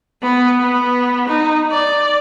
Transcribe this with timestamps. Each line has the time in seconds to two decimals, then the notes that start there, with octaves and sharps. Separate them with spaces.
0.22 B3
0.61 B3
1.28 D#4
1.71 D5